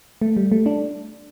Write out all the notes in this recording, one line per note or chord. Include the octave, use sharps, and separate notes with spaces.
A3
G3
A3
D4